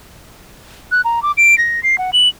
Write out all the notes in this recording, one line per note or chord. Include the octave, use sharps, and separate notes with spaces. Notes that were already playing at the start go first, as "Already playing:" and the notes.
F#6
A#5
D6
D7
A#6
C7
F#5
F#7